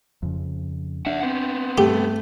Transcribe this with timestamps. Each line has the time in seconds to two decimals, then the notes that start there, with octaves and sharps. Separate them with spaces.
0.23 F2 C#3
1.06 D4 E5 F#5
1.22 B3 C4
1.78 G2 A3 G4